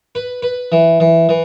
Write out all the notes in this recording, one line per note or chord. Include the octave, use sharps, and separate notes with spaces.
B4
B4
E3
E3
E3